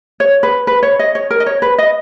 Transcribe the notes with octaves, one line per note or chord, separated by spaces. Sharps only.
C#5
B4
B4
C#5
D#5
C#5
A#4
D#5
C#5
B4
D#5